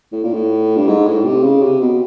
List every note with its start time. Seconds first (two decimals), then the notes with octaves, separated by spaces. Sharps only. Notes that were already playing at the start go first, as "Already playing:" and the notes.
0.12 A2
0.24 A#2
0.33 A2
0.76 G2
0.87 G#2
1.07 A2
1.24 C3
1.43 C#3
1.62 C3
1.81 B2